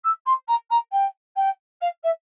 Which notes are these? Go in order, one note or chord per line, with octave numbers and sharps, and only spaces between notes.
E6
C6
A#5
A#5
G5
G5
F5
E5